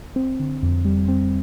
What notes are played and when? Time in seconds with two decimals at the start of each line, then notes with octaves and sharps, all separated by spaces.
0.16 C4
0.39 D3
0.62 F2
0.85 G3
1.08 C4